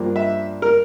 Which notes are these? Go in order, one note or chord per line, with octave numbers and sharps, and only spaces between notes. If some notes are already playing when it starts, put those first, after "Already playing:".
Already playing: G2 F3 A#3 D4
E5
A#4